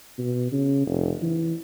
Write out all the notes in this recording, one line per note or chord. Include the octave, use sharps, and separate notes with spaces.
B2
C#3
F1
E3